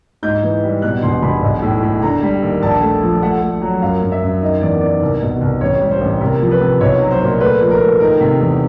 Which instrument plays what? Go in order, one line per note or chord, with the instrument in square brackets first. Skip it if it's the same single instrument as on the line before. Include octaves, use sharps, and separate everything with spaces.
[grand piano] G#2 G6
E3
G3
B2 F#6
E1 C6
E1 B5
B1
A2
A2
D3 A#5
G3
D#2
A#1 A5
A3
F3
A3 F#5
A3
F#3
F#2 F5
F#2
E5
F#2
D#3 D#5
E2 D5
D#3 D5
C2
B2
C2
A1 C#5
G3
C5
A1
C3 A#4
F3
B4
C3
B1 C#5
F#3
C5
A#2
A3 B4
F3
A#4
A3
D#3 A#4
C3
E2